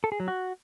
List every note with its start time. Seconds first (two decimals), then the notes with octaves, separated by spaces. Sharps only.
0.04 A4
0.12 G#4
0.20 F#3
0.28 F#4